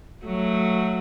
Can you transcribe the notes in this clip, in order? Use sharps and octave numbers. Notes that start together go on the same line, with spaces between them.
F#3 A3